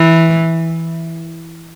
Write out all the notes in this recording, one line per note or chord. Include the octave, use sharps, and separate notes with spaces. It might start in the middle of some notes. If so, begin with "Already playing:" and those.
Already playing: E3